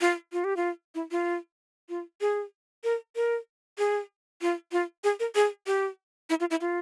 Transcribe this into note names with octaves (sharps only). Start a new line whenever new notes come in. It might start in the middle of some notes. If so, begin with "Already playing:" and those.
F4
F4
G4
F4
E4
F4
F4
G#4
A#4
A#4
G#4
F4
F4
G#4
A#4
G#4
G4
E4
F4
E4
F4